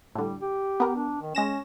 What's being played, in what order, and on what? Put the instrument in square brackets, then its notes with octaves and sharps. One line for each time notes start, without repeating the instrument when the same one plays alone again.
[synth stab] A2 D3 [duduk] G3
[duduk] G4
[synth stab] B3 A#4
[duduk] D4
D#3
[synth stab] G#3 A#6 E7 [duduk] C#4